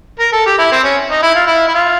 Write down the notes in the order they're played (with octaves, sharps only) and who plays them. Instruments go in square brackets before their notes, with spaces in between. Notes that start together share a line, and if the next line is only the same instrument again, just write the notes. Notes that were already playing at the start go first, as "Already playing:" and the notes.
[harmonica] A#4
A4
G4
E4
C4
C#4
D#4
E4
F4
E4
E4
F4